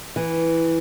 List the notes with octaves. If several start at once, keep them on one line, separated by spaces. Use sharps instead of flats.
E3